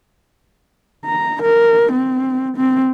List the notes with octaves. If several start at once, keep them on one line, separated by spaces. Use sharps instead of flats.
A#5
A#4
C4
C4